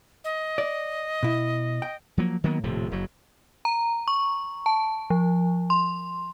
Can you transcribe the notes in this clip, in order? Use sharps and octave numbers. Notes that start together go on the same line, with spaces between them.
D#5
D5
B2 E4
G5
F3 F#3 A#3
D#3 F#3 A#3 B3
D#1 A2 C3 F3
F#1 F#3
A#5
C#6
A5
F3
C6